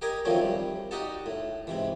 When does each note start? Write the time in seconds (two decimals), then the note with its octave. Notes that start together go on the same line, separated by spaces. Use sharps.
0.02 G4 A#4 D#5 G#5 D#6
0.25 D#3 F3 F#3 A3 C4 C#4
0.41 G3
0.91 D#4 F#4 G4 D#5 F#5 A5
1.26 A2
1.67 G#2 C3 E3